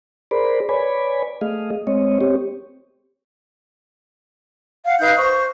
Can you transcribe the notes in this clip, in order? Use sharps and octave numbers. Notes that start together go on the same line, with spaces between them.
G#4 A#4 C5 D5 B5
B4 C#5 D5 G#5 B5
A3 G#4 D#5 F5
G#3 C4 C#5 D#5
C4 G4 C#5
F5 F#5
D#4 B4 F5 G6
C5 C#6